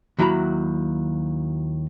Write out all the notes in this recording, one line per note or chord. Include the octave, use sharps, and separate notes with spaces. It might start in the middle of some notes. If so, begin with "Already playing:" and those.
D#2 F#3 E4 F#4 A#5 B5